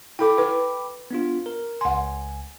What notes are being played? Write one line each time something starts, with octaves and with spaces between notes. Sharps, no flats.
E4 A4 G5 B5 D6
E4 B4
B3 D4 F4
A#4
C#2 F#5 G#5 C6